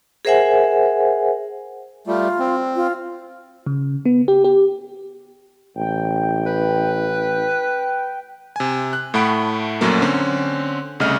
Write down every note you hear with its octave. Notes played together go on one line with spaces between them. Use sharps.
G#4 A#4 C5 E5 F#5 G#5
G3 A3 F4
C4
F4
C#3
B3
G4
G4
A1 G5
B4
C3 G#5
F#6
A2 A3 F#5 B5 D7
A#1 F#2 F#3 A3 A#3
D3 C4 C#4
C2 C#3 A3 D#5 F6